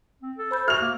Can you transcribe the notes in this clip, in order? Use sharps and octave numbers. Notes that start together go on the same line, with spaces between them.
C4
A4
C5 B5 G6
F#4 E5 F6 F7
A#3